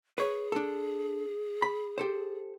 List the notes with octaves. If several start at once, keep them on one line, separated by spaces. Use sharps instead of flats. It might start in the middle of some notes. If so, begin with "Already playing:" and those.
G#4 B4 C#5
D4 A4
B5
G4 A4 C5